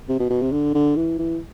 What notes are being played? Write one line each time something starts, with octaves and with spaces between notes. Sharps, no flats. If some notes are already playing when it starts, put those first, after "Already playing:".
C3
B2
B2
C3
D3
D3
E3
E3